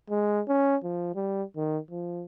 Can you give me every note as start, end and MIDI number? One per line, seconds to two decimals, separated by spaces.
0.10 0.41 56
0.48 0.76 61
0.84 1.13 53
1.15 1.43 55
1.56 1.78 51
1.91 2.25 53